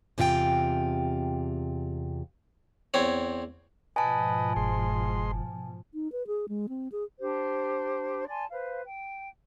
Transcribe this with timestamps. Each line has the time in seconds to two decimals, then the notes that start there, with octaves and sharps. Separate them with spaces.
0.18 E2 C3 E4 F4 G5
2.94 E2 C4 C#5
3.96 G#2 B2 F3 B4 D#5 G#5 A5
4.56 F#1 G#3 C6
5.94 D#4
6.12 B4
6.27 G#4
6.49 G#3
6.69 C4
6.92 G#4
7.20 D4 G4 C5
8.28 D5 G#5 A5 C6
8.51 B4 C5 F5
8.85 G5